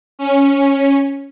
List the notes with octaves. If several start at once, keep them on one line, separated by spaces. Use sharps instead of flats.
C#4